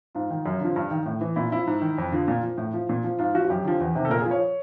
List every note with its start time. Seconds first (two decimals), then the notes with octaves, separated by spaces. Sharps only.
0.15 G#2 F4
0.30 D#3
0.46 F#2
0.61 D3 F3
0.76 G2
0.91 D#3
1.06 A2
1.21 E3
1.36 A#2 E4
1.52 F3 E4
1.67 G#2
1.82 D#3
1.98 F2
2.12 D3 F3
2.27 A#2 F4
2.43 F3
2.58 A2
2.74 F3
2.89 A#2
3.04 F3
3.19 G#2 F4
3.34 F3 F#4
3.45 F#4
3.50 F#2 G4
3.64 D3 F3
3.80 E2
3.95 C3 D#3
4.05 A4
4.10 A#2 A#4
4.20 G#4
4.26 F3
4.31 C#5